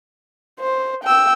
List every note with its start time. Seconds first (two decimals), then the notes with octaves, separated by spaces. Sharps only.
0.60 C5
1.04 G5 E6